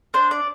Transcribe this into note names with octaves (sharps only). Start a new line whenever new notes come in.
D4 C5
D5